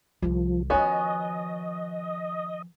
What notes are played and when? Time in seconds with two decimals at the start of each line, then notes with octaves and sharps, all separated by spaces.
0.22 C2 D#3 F3
0.70 D#3 F3 B3 C#4 F#4 D#5